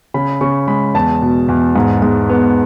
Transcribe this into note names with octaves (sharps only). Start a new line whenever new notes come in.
C#3 B5
C#3 C#6
G#3 B5
E2 A5
B2
E2
G#2
G#2
B3